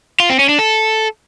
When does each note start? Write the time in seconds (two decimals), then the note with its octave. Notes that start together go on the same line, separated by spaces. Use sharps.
0.20 F4
0.29 C4
0.39 C#4
0.49 D4
0.59 A4